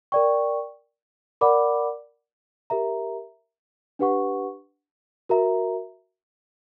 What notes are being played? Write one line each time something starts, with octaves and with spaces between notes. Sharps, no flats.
A#4 D5 G5 C#6
A#4 D5 F#5 B5 D6
G4 A#4 E5 A#5
D4 G4 B4 F#5 C#6
F#4 A#4 E5 A#5